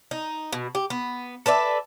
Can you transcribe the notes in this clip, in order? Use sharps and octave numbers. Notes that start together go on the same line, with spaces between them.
D#4
B2
G4
B3
A4 B4 D5 E5